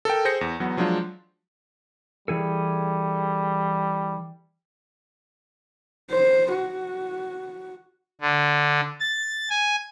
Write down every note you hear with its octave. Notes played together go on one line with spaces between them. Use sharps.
A4 A#4 G5
G#4 C5 G6 A#6 C#7
E2
E2 F#3 B3
F3 F#3 G#3 D4 F4
E3 G3 G#4 A4
C5
F#4
D3
A6
G#5